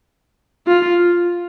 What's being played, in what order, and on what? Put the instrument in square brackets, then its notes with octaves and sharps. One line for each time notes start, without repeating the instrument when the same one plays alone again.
[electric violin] F4